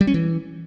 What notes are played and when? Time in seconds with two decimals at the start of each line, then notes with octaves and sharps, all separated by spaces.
0.01 G3
0.07 C#4
0.14 E3